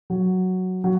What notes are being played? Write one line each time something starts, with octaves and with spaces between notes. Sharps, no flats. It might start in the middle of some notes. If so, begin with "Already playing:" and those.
F#3
F#3